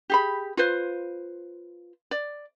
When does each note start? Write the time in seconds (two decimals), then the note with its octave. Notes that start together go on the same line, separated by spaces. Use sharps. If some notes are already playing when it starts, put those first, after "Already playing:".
0.10 G4 G#4 B5
0.57 F4 B4 C5
2.11 D5